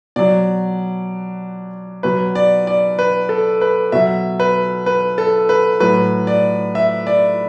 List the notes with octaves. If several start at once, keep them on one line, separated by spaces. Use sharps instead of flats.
B2 F#3 D5
B2 F#3 B4
D5
D5
B4
A4
B4
B2 F#3 E5
B4
B4
A4
B4
A2 F#3 B4
D5
E5
D5